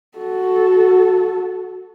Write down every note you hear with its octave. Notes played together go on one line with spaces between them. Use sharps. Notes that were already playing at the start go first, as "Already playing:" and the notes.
F#4 A4